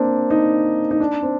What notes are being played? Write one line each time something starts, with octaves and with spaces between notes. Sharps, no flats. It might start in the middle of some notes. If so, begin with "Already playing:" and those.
Already playing: A#3 C4 D4
D#4
D#4
D4
C4